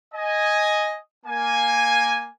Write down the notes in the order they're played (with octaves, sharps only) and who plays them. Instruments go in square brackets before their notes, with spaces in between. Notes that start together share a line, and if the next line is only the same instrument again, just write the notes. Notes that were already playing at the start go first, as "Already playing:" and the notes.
[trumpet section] D#5 G#5
A#3 G#5